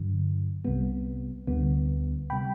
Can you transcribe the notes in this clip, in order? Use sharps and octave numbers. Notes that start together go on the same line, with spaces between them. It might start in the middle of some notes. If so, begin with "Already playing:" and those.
Already playing: G2 D3 F#3
C2 C3 G3 B3
D2 D3 G3 B3
C3 G3 G5 B5